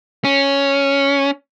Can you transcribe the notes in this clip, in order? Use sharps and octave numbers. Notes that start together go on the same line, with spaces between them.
C#4